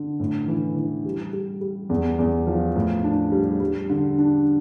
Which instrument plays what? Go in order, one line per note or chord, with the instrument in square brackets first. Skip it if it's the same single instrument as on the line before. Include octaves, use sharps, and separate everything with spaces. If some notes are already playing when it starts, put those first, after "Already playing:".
Already playing: [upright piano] D3
A2
E3
E3
G3
G3
G3
E2
E2
F3
A2
D4
G3
G3
D3
D4